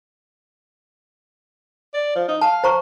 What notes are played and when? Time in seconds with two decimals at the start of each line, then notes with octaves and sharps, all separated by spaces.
1.94 D5
2.16 F3
2.28 D#4
2.41 F5 A5
2.64 C5 A#5 C#6